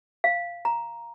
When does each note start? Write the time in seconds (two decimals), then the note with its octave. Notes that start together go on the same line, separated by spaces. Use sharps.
0.24 F5
0.65 A#5